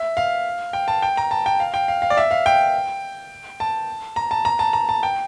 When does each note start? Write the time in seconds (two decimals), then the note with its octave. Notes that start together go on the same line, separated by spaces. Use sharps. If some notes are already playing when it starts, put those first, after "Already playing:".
Already playing: E5
0.17 F5
0.73 G5
0.88 A5
1.02 G5
1.17 A#5
1.31 A5
1.46 G5
1.60 F5
1.74 G5
1.88 F5
2.02 F5
2.10 D5
2.17 E5
2.31 F5
2.46 G5
3.60 A5
4.16 A#5
4.31 A5
4.45 A#5
4.59 A5
4.73 A#5
4.89 A5
5.03 G5